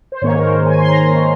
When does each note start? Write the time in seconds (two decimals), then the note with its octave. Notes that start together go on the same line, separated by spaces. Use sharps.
0.12 C5
0.22 G#2 D#3 A#3 C#4 C#5
0.37 A#4
0.44 C5
0.66 G#5
0.79 C6
0.89 A#5
1.12 D#3 A#3 C#4